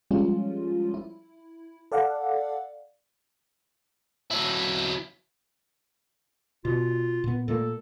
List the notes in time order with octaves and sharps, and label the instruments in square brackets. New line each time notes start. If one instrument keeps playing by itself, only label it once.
[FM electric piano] F3 G3 G#3 C#4 F4
E4
A4 D5 F5 F#5
[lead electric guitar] F#3 E4
[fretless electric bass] B2 [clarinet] F4
[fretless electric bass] A#2 B3
[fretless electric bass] A#2 A3 A#3 [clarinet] A4